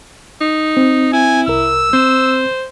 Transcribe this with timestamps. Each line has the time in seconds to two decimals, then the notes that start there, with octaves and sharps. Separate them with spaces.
0.41 D#4
0.77 C4
1.13 E4 G#5
1.48 C2 A#4 E6
1.93 C4 C5